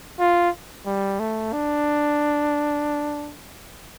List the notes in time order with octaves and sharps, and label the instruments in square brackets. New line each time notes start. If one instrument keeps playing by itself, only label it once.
[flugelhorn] F4
G3
A3
D4